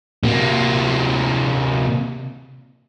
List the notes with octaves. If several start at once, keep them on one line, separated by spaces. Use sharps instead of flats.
C3 A#3